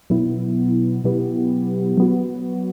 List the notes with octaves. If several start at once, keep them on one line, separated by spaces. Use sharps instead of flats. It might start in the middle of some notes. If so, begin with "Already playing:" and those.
B2 F#3 B3 E4
B2 F#3 B3 E4 G4
F#3 B3 F#4